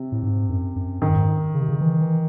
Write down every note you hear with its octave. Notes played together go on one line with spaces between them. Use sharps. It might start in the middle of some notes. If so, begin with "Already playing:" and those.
Already playing: C3
A2
G#2
F#2
F#2
G#2 D#3
F#2
G#2
C#3
C3
C#3
E3
E3